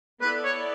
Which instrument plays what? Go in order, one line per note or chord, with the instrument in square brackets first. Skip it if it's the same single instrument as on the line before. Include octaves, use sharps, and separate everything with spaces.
[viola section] B3 E4 A4 D5 [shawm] B4
[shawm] C#5